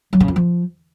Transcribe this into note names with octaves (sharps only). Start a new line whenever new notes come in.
F#3
C#3
F2
F3